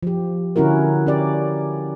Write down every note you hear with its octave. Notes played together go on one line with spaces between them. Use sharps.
F3 G4
D3 C#4 E4 F#4 A#4
C#4 G4 D5